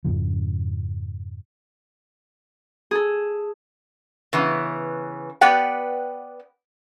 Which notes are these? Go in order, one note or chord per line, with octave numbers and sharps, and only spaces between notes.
F2 G#2 C#3 F3
G#4 A4
C#3 E3 B3
B3 G4 B4 D5 F#5 G5